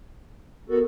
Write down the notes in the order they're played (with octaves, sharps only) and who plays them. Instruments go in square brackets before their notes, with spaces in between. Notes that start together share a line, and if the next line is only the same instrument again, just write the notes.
[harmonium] B3 F#4 A4 [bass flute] A#4